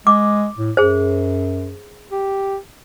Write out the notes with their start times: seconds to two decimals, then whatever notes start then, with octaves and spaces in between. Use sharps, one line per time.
0.07 G#3 D6
0.57 A2
0.77 F#2 G#4 C5
2.12 G4